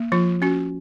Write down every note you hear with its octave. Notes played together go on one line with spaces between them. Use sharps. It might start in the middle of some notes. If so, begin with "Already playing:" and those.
Already playing: A#3
F3 F4
C#4 F#4